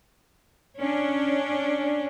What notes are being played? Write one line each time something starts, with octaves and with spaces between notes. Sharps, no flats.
C#4 D4